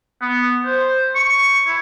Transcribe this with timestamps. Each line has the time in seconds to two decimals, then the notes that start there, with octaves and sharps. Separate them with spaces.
0.22 B3
0.65 C5
1.15 C#6
1.67 E4